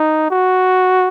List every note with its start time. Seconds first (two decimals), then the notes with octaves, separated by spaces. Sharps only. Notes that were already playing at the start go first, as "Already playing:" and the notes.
Already playing: D#4
0.31 F#4